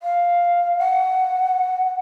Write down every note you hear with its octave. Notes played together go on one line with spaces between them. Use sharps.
F5
F#5